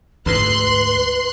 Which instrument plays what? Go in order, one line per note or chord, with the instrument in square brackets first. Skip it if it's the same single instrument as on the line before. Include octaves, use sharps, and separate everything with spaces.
[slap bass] D2 G#2 [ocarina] B4 [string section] C6 F#6